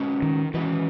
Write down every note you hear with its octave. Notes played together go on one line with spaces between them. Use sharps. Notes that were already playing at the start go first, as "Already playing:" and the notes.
Already playing: G#3 C#4 F#4 B4 D#5
D#3
E3 G#3 C#4 F#4 B4 D#5